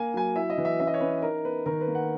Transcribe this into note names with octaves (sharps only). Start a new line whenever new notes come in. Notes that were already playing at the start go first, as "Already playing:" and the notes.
Already playing: A#3 G#5
F#3 G#5
E4 E5
D#5
E3
E5
C#4 E5
D#5
C#5
C#4 B4
D#4 A#4
B3 B4
D#3 A#4
B4
A#3
F#5